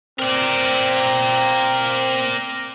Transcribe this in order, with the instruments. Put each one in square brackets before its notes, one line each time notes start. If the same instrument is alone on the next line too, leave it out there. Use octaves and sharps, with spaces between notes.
[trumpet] C4 [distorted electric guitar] A#4 D5